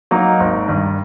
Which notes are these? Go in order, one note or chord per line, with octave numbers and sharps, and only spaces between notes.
F#3 A#3 D#4
G#1
G2 D#3